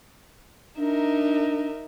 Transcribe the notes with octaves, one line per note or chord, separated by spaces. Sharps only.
D4 D#4 A#4 E5